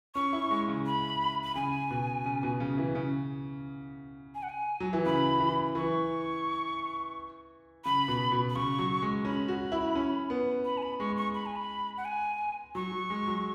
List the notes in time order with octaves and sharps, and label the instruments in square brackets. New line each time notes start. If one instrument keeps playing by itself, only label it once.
[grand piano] C#4 [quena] C#6
[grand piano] E4
G#3
C#3
[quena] B5
B5
[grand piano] C#3 [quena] G#5
[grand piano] B2
C#3
B2
C#3
E3
C#3
[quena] G#5
F#5
G#5
[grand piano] F#3
E3
[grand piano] C#3 [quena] B5
[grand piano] E3
[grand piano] E3 [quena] C#6
[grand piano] C#3 [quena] B5
[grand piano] B2
B2
[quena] B5
[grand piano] C#3 [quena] C#6
[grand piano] F#3
G#3
[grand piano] C#4 [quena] B5
[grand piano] F#4
E4
C#4
B3
[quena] B5
G#5
B5
[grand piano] G#3 [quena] C#6
[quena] C#6
B5
G#5
B5
F#5
G#5
[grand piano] F#3 [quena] C#6
[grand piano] F#3
G#3
F#3